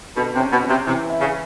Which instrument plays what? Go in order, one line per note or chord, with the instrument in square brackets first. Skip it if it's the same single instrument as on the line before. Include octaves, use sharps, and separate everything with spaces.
[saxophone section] B2 [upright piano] D3
[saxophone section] C3
[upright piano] C#4
[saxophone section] B2
[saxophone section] C3 [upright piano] C#4
[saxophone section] C3 [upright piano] E3
[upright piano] E4
[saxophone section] C#3